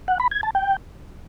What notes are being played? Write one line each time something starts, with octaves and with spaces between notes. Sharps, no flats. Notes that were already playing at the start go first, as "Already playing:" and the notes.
F#5
B5
G#6
A5
G5